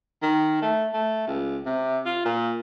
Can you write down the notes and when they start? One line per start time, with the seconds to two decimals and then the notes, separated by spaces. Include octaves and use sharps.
0.22 D#3
0.62 A3
0.94 A3
1.27 C#2
1.66 C3
2.06 F4
2.25 A#2